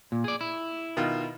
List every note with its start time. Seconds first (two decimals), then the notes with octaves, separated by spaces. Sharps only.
0.12 A#2
0.24 G#4 D5
0.41 E4
0.97 B2 D#3 F4